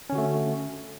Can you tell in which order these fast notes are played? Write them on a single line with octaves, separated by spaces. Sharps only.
C#4 D3 F#4 A3